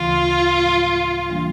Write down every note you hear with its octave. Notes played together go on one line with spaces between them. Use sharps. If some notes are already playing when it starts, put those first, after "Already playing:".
Already playing: D2 C#3 E3 A3 F4
A2 F3 G#3
E3 G3 A#3 D4